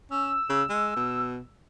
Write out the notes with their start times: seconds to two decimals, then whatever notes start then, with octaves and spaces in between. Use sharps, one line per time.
0.11 C#4 E6
0.50 C#3
0.69 G#3
0.97 B2